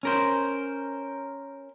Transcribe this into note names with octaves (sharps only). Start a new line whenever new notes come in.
C#4 A#4 C5